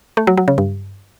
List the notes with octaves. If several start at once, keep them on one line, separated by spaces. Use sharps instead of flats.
A3
F#3
F#3
C#3
G2